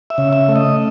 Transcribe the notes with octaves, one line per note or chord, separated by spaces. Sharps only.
E5
C#3
E5
A3
D#5